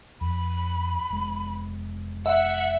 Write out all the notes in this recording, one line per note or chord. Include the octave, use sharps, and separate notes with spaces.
F2 B5
F1 G#3
E5 F#5